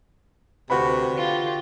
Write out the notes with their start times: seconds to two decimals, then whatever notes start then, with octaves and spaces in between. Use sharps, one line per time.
0.70 D2 C3 F#4 B4 B5
1.13 D3 F4 G4